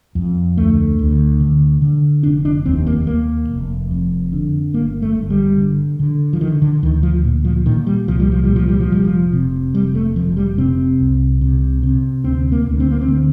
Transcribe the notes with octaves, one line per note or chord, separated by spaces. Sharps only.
F2
D2 A3
D2
D3
D3
F1 D4
D4
D#2 C4
A#3
D#2 A#3
F1
F2
D3
G1 A#3
A3
G1
G3
D3
D3
F3
D3 D#3
D3
D2 D#3
F3
A#2
F3
A#2 D#3
G3
C2 F3
G3
F3
G3
A#2
F3
G3
F3
F1 G3
F3
C3
F1 G3
A3
F1 F3
G3
C3 C4
C2
C3
C3
D2 C4
A#3
D2
C4
A#3
C4
D3